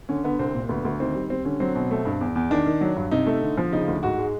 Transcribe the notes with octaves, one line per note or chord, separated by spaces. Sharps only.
D3 C#4
D3 B3
C2 C4
A#2
D2 B3
D2
D#3 C4
G3
G3 C4
D3 C#4
F#3 C4
B2
A3
G2
E2
E2
D#3 D4
D#3
F#3
G2
C3 D#4
A3
D3
F3
C#3 D#4
D2
G#2 F#4
G#3